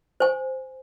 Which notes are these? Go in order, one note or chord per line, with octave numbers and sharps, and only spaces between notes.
C5 G#5